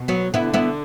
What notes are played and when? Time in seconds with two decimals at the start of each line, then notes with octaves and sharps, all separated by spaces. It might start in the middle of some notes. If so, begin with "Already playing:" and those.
Already playing: B2
0.08 F#3 B3
0.34 D3 B3 E4
0.54 B3 E4